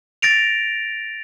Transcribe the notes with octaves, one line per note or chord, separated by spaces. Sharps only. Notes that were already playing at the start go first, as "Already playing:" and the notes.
A6 A#6 D7 F7